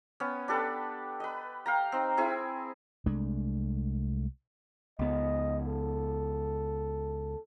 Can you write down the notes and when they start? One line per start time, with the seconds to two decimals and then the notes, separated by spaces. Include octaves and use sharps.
0.20 B3 C#4
0.48 D4 G4 A4 B4
1.20 B4 D#5
1.66 F5 G5 A#5
1.92 C4 D#4
2.17 C4 E4 G#4
3.06 C2 G#3 A3 D4
4.99 C#2 B3 D#5
5.67 A4